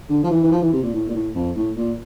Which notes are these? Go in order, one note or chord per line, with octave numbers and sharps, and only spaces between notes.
D3
F3
E3
E3
F3
E3
C3
A#2
A2
A#2
A2
F2
A2
A#2